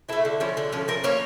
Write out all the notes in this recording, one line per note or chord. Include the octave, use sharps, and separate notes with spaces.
A3 E4 A4
D3
F3 C#4
D3
F3 C#4
F3 A#4
A#3 C#4 C#5